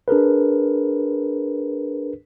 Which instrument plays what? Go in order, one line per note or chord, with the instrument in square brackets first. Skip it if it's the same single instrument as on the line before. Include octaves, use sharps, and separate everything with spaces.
[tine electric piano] D4 G#4 A#4 B4